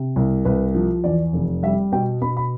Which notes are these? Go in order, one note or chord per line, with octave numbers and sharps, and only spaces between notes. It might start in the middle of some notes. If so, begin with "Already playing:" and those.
Already playing: C3
C2
C2 B4
F3
E2 D5
F1
G3 E5
B2 G5
B2 B5
B5